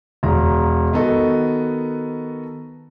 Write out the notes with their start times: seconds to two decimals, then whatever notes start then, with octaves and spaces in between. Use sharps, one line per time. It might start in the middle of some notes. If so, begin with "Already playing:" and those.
0.23 E1 A#5
0.92 D#3 B3 F#4 A4 D#5